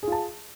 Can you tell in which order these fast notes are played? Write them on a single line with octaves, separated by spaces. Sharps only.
G#4 F4 A5